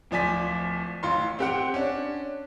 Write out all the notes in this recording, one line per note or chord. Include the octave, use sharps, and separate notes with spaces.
D1 F3 D5 G#5 B6
A1 F4 C6
C4 G4 F#5
C#4 D4